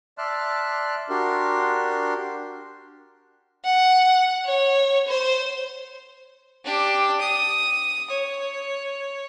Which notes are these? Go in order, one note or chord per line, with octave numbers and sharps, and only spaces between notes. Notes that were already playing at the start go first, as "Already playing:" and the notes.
D5 E5 A5 C6 F6 F#6
D4 F#4 G4 A#4 C6
F#5
C#5
C5
D4 G4
D#6
C#5